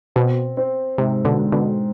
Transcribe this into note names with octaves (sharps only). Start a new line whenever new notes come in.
B2 C4
C4
G#2 C3
B2 D3
G#2
B2 D3